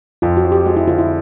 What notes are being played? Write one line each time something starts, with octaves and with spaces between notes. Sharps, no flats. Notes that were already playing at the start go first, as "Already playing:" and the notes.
F2 F4
F#4
F3
G4
G#3 F#4
E4
D3 F4
E4